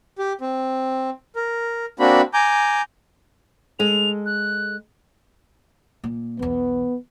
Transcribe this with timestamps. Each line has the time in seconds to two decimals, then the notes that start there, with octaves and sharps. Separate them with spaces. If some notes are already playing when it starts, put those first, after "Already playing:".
0.18 G4
0.41 C4
1.36 A#4
1.99 A#3 C4 D4 F#4 B5
2.34 G#5 A#5 D6 G6
3.79 G#3 A4 F7
4.26 F#6
6.04 A#2
6.39 B1 E2 B3